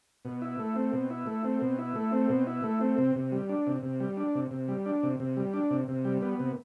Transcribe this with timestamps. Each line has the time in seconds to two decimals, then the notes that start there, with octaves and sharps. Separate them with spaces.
0.25 B2
0.42 E4
0.59 A3
0.76 C4
0.93 B2
1.10 E4
1.27 A3
1.44 C4
1.61 B2
1.78 E4
1.96 A3
2.12 C4
2.29 B2
2.47 E4
2.64 A3
2.81 C4
2.98 C3
3.15 C3
3.32 G3
3.49 D4
3.67 C3
3.83 C3
4.00 G3
4.17 D4
4.35 C3
4.51 C3
4.68 G3
4.86 D4
5.03 C3
5.20 C3
5.37 G3
5.54 D4
5.71 C3
5.88 C3
6.05 G3
6.22 B3
6.39 C3